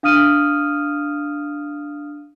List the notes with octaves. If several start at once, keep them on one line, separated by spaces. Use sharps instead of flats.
D4 F5 D#6 F6 D#7